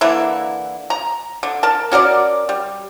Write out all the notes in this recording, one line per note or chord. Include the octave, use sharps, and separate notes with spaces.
D3 E3 A#3 E4
A#5
D3
A#4 A5
C#4 F#4 A#4 D5
G3